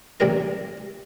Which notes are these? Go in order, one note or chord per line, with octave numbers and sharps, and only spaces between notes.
A1 C3 G3 D4 A#4 A#5